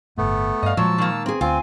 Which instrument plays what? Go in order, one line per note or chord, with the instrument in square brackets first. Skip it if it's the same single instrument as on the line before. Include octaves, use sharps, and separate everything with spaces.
[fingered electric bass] G1 A2 [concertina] A3 B3
[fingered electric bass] G2 [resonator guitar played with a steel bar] D#5 F5
[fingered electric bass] A#2 G#3 [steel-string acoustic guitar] F3 [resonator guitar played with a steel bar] F#3 [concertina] A5 E6
[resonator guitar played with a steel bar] D#3 A#3
[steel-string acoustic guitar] C4 G#4
[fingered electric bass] D2 [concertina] C4 [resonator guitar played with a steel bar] F4 [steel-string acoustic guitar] G#5